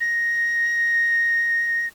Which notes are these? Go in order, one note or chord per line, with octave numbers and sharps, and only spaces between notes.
A#6